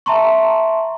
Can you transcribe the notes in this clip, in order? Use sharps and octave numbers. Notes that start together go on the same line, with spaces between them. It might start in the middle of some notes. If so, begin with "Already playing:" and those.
E5 A5 A#5 C6 C#6